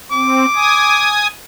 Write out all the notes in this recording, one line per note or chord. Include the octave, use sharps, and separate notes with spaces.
C4 D6
G#5 D#6